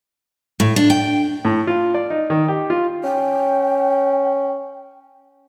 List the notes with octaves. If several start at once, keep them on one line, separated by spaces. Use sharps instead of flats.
A2
D4
G5
A2
F4
D5
D#4
D#3
G4
F4
C#4 G5